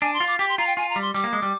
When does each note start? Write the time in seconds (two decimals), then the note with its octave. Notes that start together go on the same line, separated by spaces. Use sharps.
0.02 D4 G#5
0.14 C6
0.20 F4
0.27 D6
0.39 G4 D6
0.49 C6
0.58 F4 A#5
0.67 G5
0.77 F4 G#5
0.89 A#5
0.96 G3
1.02 C6
1.14 G3 D6
1.24 A#3
1.33 G#3
1.42 G3